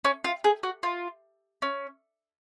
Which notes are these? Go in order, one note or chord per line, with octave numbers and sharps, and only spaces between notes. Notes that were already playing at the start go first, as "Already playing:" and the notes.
C#4
F4
G#4
F#4
F4
C#4